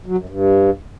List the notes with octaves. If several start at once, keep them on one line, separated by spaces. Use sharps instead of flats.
F#3
F#2
G2